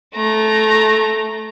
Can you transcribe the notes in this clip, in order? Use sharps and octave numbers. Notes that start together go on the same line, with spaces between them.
A3 A#5